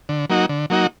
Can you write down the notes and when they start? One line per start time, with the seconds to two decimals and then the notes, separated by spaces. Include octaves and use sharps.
0.09 D3
0.30 F#3 A#3 D#4 F#4
0.49 D3
0.70 F#3 A#3 D#4 F#4